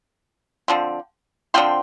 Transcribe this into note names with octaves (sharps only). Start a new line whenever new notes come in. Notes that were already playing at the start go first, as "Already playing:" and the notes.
D3 F3 C4
D3 F3 C4 G5 C6